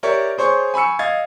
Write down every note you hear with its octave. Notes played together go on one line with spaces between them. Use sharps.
G4 A#4 C#5 D5 E5
G#4 C5 C#5 C6 C#6
G#5 B5 C#6 E6 C#7
D#5 F5 G#6 A6